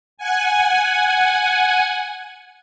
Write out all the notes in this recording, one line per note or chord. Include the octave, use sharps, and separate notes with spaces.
F#5 G#5